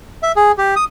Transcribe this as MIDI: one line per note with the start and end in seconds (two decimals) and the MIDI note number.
0.23 0.32 76
0.36 0.52 68
0.58 0.75 67
0.76 0.85 87